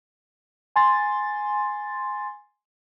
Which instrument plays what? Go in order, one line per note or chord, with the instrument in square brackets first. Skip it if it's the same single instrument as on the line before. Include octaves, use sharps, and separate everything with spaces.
[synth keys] G#5 C6 A6